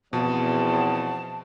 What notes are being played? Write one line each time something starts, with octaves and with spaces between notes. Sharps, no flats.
E2 B2 F3 C4 A5